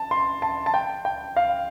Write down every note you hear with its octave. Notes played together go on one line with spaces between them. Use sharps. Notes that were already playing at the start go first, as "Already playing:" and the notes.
Already playing: A5
C6
A5
A5
G5
G5
F5